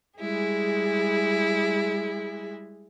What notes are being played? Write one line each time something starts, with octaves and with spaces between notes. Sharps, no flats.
G3 G#3 E4 G#4